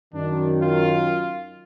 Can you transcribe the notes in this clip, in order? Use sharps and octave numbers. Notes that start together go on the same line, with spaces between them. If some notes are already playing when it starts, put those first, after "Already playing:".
F#2 D#3 D4
F4